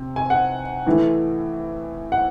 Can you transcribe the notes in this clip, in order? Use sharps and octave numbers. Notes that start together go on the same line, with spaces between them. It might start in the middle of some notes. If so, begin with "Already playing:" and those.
Already playing: C3
G#5
F#5
A2 E3 A3
F#5